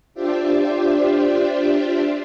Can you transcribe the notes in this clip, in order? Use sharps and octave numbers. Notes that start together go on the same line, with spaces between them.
D4 F4 G4 C5 D5 E5